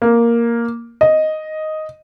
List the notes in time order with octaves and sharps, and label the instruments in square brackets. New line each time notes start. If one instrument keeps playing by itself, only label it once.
[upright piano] A#3
D#5